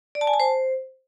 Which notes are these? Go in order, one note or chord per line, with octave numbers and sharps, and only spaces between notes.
D5
A5
G#5
A5
C5